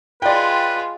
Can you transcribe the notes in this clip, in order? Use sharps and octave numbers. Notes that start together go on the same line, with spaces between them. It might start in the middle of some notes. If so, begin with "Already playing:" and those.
G#3 F4 B4 D5 G5